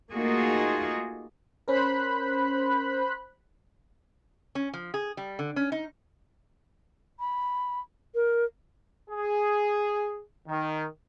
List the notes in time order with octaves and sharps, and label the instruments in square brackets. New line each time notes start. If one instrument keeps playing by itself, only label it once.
[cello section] A3 A#3 D#4 F4 F#4 G#4
[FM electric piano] C#4 A#4 [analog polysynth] C5 B5 F#6
[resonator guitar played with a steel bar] C#4
F3
G#4
G3
D3
C#4
D#4
[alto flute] B5
A#4
[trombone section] G#4
D#3